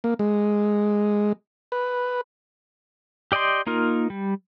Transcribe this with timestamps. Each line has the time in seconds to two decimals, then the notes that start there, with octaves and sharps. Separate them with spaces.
0.04 A#3
0.19 G#3
1.72 B4
3.32 G4 D5 D#5 G5 C6
3.67 A#3 D#4 F4 A#4
4.10 G3